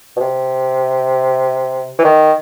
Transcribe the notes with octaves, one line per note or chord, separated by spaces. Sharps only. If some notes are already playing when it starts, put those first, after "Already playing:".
B2
C3
E3
D#3